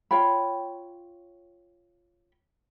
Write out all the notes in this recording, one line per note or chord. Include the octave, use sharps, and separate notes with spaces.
F4 C#5 G5 B5